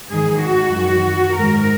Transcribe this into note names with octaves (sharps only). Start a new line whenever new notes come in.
G#2 D#3 G#4
F#4
F#2 D#3
G#2 D#3 A#4